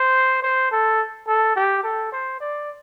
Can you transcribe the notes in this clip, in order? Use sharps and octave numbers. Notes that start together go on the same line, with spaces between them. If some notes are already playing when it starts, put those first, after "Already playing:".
Already playing: C5
C5
A4
A4
G4
A4
C5
D5